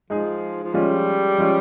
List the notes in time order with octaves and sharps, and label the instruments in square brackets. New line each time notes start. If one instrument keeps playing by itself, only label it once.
[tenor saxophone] F3 [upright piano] G#3 D#4 G#4
[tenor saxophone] F3
[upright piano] F3 G#3 C#4 F4 [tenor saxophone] G3
[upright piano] F3 G#3 C#4 F4